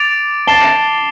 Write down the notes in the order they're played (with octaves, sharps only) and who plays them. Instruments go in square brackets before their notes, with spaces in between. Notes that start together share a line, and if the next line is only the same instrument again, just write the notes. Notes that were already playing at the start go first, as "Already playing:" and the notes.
Already playing: [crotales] D6 A6 D7 F7
[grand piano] A5 [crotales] D6 A6 C7 E7 G7